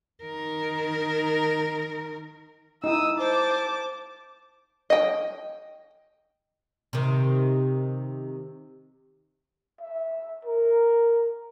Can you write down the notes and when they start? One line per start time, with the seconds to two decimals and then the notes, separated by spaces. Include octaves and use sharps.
0.23 D#3 A#4
2.84 D#4 E4 D#6 E6
3.19 C5 A5 D6
4.90 D#5 G5
6.93 C3 D#3
9.81 E5
10.45 A#4